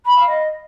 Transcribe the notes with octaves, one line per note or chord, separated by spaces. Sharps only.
B5
F5
D#5